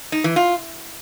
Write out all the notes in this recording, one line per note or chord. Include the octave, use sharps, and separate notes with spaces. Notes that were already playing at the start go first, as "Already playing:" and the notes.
D#4
E3
F4